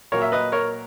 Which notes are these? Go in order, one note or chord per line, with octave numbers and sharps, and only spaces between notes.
A#2 F#3 A#3 A#4 C#5
E5
B4 D#5
A#4 C#5